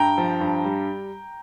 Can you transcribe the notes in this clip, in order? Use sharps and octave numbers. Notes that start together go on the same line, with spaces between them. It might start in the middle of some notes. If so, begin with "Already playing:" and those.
Already playing: G2 G5 A#5
F3
G2
G3